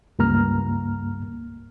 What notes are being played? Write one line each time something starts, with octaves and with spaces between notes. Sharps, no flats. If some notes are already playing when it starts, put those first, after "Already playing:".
C#2 G2 A#3 A#5 F6